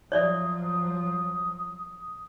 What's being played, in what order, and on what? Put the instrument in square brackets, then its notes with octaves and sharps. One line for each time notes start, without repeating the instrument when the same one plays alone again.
[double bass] F3 F#3 [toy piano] C#5 D5 E5 [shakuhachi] D#6